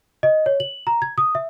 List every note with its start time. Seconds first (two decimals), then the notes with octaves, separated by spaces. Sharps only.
0.23 D#5
0.46 C#5
0.60 F#7
0.87 A#5
1.02 G#6
1.18 D#6
1.35 E5